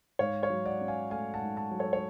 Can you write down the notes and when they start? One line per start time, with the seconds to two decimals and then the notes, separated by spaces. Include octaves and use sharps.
0.19 G#2 C#5 F5
0.43 C#5 F5
0.50 F#3
0.65 D5 F#5
0.81 C#4
0.88 F5 G#5
1.10 A3 F5 G#5
1.34 F#5 A5
1.41 G#2
1.56 F#5 A5
1.71 F#3
1.79 A4 C#5
1.93 C#5